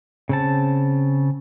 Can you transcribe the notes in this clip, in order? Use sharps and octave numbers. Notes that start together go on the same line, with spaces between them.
C#3 C4 A5